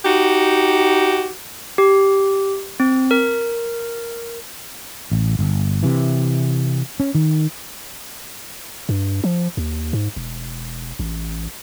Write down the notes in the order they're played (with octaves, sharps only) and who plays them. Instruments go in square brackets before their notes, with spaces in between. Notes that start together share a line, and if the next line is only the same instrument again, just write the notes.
[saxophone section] D#4 F#4 G4
[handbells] G4
C4
A#4
[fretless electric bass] A1
G1
C3 E3
C#4
D#3
[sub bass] G2
F3
D#2
G#2
E1
A1